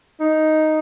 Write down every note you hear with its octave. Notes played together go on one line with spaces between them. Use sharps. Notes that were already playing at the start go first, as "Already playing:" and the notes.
D#4